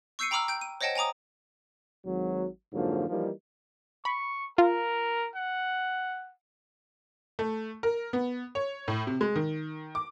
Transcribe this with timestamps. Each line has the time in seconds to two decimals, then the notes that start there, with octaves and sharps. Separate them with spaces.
0.19 C#6 E6 G6 C7 C#7 D#7
0.31 G5 A#5 B5 D6 E6 F6
0.48 G5 G6 D7
0.61 D#7
0.81 C5 C#5 D#5 F#5 G5 A5
0.95 G5 G#5 A#5 D6 D#6
2.05 G#1 F#3
2.73 F2 G#2 D3 F3 F#3 A#3
3.09 E3 F3 G3 A#3 D#4
4.05 B5 C#6
4.58 F4 A#4
5.35 F#5
7.39 A3
7.83 A#4
8.13 B3
8.55 C#5
8.88 A2
9.07 C3
9.21 G#3
9.36 D#3
9.95 D6